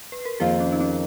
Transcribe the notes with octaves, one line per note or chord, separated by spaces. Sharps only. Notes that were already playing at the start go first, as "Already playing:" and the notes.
B4
A#4
F2 D#3 A#3 F4 G#4
C#4
D#4
C#4